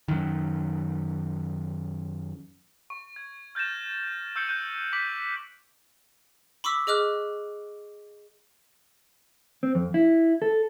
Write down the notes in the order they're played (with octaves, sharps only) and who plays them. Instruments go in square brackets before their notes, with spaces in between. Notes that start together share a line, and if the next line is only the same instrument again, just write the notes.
[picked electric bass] F#2 D#3
[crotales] C#6
G#6
F6 G6 A6 A#6 E7
C#6 E6 G6 C7 C#7 G7
F#6 G6 D#7
D6 B6 D7 F#7
[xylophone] B5 C#6 D6 E6 B6
G#4 D#5 D6 F6 F#6
[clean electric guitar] C4
F2
E4
A4